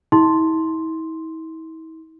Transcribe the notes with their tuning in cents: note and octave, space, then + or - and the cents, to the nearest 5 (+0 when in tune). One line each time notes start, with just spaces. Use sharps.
E4 -45 C6 +0